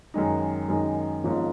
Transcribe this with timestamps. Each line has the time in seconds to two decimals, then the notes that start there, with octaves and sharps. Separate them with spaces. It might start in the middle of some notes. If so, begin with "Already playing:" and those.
0.14 F#2 D#3 G#3 D#4
0.69 F#2 D#3 G#3 D#4
1.24 G#1 G#2 F3 A#3 C#4